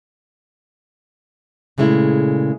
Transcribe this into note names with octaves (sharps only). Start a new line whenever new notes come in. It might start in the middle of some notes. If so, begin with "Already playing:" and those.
A#2 C#3 G#3 A3 E4